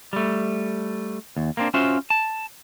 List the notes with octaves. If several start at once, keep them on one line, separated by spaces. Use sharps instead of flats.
G3 A3
D#2
A#3 C4 D4
C#4 F4 F#4 C5 E5
A5